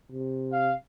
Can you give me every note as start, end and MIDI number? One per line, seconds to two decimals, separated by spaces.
0.12 0.72 48
0.52 0.74 77